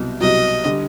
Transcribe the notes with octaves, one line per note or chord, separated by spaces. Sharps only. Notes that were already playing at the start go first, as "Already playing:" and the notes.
Already playing: C2 B2 F#3
C2 B2 F#3 D#5
D3 G3